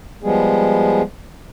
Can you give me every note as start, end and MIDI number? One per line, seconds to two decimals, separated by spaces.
0.23 1.02 53
0.23 1.02 55
0.23 1.02 56
0.23 1.02 59
0.23 1.02 68